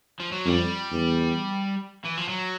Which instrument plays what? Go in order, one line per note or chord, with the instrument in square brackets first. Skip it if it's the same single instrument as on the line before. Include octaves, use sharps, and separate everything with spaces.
[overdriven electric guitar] F3
F#3
[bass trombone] F2 [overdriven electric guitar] G3
[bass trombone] E2
[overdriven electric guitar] E3
F3
F#3